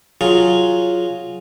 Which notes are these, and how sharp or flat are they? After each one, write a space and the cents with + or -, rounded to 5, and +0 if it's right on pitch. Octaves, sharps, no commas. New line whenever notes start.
F#3 +0 F4 +0 G#4 +5